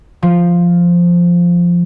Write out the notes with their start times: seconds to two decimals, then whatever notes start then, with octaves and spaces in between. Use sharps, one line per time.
0.22 F3 F4